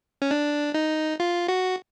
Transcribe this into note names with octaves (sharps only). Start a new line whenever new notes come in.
C#4
D4
D#4
F4
F#4